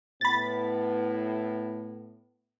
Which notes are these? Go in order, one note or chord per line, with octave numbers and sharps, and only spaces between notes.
A2 B3 B5 A6